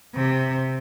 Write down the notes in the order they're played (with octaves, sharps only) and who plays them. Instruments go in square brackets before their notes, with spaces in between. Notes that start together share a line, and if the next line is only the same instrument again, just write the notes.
[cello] C3